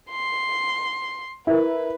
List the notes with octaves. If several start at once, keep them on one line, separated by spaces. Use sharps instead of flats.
C6
E4 A#4 B4